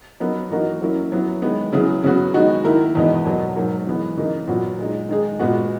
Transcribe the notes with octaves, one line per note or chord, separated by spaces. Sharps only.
F#3 B3 D#4 A#4
E3 A#3 D#4 F#4
F#3 A#3 C#4 E4
F#3 B3 E4
D#3 G#3 B3
C#3 F#3 B3 E4 G#4
C#3 F#3 B3 F#4
D#3 G#3 B3 D#4 F#4
D#3 A#3 E4 A#4
E2 B2 G#3 B3 D#4
B2 F#3 A#3
G#2 F#3 A#3
E3 G#3 B3
C#3 E3 A#3 D#4
A#2 F#3 B3 F#4
A#2 G#3 D#4
D#3 G#3 D#4 G#4
A#2 G#3 B3 F#4